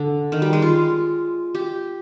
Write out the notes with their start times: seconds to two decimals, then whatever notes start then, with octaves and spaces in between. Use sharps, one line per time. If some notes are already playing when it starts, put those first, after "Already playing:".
Already playing: D3
0.32 D#3
0.42 G3
0.53 G#3
0.62 F4
1.55 G4